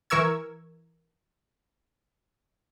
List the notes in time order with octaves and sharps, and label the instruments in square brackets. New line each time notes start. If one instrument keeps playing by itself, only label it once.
[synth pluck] E3 A#4 C#6 E6 G#6